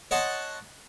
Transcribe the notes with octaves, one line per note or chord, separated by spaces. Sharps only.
C#5 D#5 F#5 A5 C6